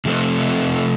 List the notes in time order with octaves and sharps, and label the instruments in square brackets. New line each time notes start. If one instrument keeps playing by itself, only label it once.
[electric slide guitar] C3 F3 A3 C4